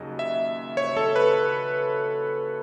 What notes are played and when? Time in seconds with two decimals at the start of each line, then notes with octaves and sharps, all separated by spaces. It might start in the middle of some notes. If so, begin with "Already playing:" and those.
Already playing: D#2 C#3 F#3 D#5
0.19 E5
0.77 C#5
0.97 A4
1.16 B4